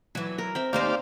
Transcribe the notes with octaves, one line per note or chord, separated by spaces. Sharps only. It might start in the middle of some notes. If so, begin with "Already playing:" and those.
E3 F#3 E5
A#4
C4 E5
D#2 D#4 G4 C5 D5 F5